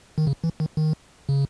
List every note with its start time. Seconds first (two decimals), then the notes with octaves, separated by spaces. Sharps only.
0.18 D#3
0.27 C#3
0.44 E3
0.60 D#3
0.77 D#3
1.29 C#3